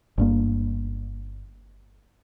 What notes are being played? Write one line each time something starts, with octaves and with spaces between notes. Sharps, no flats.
G1 G2 A#3